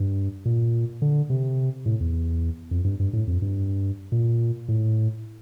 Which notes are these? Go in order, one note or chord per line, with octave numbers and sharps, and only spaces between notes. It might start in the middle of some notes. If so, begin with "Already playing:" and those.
Already playing: G2
A#2
D3
C3
A2
E2
F2
G2
G2
A2
F2
G2
A#2
A2